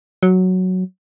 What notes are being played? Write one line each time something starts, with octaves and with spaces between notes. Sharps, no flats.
F#3